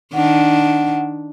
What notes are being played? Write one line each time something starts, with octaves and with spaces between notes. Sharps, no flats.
D#3 D4 F#5